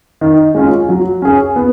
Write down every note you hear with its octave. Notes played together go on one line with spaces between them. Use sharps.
D#3
G#3 C#4 F4
F#3
C#4 G#4
B3